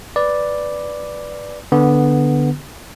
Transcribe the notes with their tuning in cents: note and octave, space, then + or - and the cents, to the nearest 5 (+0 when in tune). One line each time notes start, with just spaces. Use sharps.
B4 +0 D5 +0
D3 +0 B3 +0